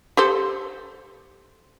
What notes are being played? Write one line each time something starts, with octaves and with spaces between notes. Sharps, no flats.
G4 A4 C5